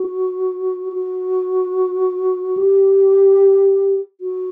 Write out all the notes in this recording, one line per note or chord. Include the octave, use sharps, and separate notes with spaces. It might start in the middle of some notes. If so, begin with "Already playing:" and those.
Already playing: F#4
F#4
G4
F#4